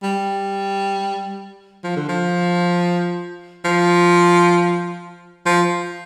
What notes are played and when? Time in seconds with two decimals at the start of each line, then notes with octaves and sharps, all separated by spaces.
0.03 G3
1.84 F3
1.96 D3
2.09 F3
3.64 F3
5.46 F3